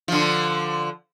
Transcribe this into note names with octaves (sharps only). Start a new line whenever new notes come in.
D3 F3